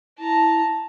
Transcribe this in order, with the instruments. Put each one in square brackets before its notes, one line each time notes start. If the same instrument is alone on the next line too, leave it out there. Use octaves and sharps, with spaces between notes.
[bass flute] E4 [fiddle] A5 A#5